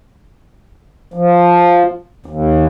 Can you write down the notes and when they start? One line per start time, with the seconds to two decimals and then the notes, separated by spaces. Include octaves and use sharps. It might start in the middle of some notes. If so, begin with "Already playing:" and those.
1.14 F3
2.26 D#2